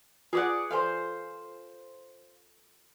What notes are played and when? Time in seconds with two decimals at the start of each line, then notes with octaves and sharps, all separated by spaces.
0.33 F4 G#4 B4 D5 F#5
0.71 A4 C5 F5 G#5 C6